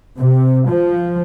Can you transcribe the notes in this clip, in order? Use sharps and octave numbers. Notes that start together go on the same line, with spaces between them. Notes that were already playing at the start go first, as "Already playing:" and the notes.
C3
F3